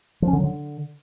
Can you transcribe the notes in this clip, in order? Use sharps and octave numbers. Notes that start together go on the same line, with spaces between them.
F3
C#4
D3
F#3
D3